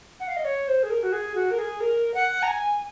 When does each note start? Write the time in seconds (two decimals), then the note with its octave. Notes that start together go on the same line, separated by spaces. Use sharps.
0.20 F#5
0.28 F5
0.37 D#5
0.45 C#5
0.68 C5
0.83 G#4
0.90 A#4
1.03 F#4
1.12 G#4
1.35 F#4
1.51 A#4
1.58 G#4
1.80 A#4
2.14 F#5
2.43 A#5
2.48 G#5